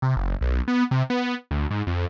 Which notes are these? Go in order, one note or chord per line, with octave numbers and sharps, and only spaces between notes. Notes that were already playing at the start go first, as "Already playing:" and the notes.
C3
F#1
B1
B3
C3
B3
D2
G#2
F2